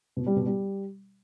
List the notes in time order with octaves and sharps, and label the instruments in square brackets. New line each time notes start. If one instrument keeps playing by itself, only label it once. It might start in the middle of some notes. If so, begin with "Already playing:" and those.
[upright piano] B2
G3
B2
G3